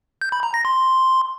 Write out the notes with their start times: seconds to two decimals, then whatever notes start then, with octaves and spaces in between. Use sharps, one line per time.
0.21 G6
0.32 B5
0.43 A#5
0.54 A#6
0.65 C6